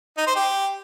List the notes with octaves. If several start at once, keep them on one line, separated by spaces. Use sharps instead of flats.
D#4
C5
G4